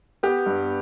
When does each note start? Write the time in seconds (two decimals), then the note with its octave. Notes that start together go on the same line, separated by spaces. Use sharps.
0.23 B3 G4
0.46 G2